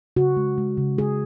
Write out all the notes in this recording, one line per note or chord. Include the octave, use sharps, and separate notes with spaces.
C#3 F#4
G#3
G#3
C#3
G#3 G#4